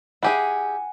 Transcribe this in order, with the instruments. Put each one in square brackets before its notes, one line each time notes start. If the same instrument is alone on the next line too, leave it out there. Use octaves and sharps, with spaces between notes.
[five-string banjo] E4 G4 G#4 [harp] F#5 G#5